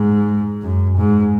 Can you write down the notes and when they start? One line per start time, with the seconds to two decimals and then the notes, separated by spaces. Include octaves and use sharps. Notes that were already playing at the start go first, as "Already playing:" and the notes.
Already playing: G#2
0.62 F#2
0.97 G#2